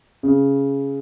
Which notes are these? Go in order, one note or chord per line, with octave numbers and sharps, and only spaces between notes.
C#3